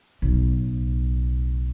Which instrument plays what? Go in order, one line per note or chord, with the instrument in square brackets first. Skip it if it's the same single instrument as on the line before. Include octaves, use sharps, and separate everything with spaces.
[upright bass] B1 A2